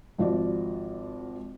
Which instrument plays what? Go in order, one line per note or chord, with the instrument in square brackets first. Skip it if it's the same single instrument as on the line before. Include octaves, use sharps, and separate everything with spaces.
[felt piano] G#1 F3 F#4 D5